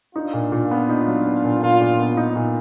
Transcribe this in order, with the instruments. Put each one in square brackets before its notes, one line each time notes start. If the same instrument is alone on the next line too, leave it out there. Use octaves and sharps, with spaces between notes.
[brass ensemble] D4 F4 [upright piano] D#4
[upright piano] A#2
A#2
B3
D#4
F#3
B3
A#2
[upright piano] A#2 [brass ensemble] D4 F4
[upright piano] A#2
B3
D#4
A#2